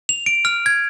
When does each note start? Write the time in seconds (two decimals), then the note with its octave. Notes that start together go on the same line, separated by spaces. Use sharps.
0.09 F7
0.26 D7
0.45 F6
0.66 G#6